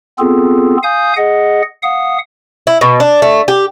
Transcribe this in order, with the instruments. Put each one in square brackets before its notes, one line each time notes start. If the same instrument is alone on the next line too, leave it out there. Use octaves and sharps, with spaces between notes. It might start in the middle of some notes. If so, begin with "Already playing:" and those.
[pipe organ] B3 C4 F4 G#4 A4
F5 G#5 D#6 G6
G#4 D#5 F#5
F5 F#5 D#6
[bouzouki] E4
B2
D4
A3
G4